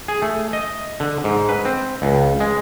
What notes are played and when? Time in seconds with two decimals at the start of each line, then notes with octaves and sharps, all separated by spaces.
0.08 G#4
0.22 A3
0.53 D#5
1.00 D3
1.24 G#2
1.49 B4
1.65 C4
2.02 C#2
2.40 G#3